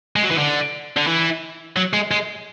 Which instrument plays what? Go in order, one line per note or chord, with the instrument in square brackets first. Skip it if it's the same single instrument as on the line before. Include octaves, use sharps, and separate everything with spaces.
[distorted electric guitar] G#3
F#3
E3
D3
D3
E3
F#3
G#3
G#3